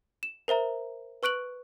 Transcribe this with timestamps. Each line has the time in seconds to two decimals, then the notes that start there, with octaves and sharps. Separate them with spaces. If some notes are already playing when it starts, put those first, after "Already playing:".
0.23 E7
0.48 A#4 C5 E5 A#5
1.23 B4 C#6 F#6 D7 F#7